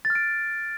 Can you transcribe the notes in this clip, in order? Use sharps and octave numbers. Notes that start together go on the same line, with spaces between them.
A6
F6
D7